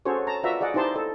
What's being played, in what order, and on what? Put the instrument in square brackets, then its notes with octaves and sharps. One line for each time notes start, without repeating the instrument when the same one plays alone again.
[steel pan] C#4 F#4 G#4 A4 C5 C#5
A5 A#5
F4 F#4 B4 D5 E5 A#5
G#4 D5 D#5 F#5
D#4 E4 G4 C5 A5 C6
A4 D#5